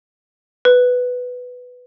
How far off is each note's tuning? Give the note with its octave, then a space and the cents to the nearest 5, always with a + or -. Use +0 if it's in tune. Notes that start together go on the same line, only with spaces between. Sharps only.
B4 +5